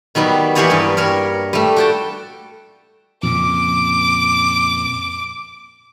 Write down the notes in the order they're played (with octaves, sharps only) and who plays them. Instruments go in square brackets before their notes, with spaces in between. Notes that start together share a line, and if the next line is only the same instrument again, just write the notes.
[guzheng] D#3 F#3 G3 B3
E3 A#3 G4 G#4 C#5 D5
G2 D4
G3 A#4 C#5
G3 A3
F#4 G5 A5
[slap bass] F2 A#2 C#3 [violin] D6